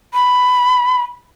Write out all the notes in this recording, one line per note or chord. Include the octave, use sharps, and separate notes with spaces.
B5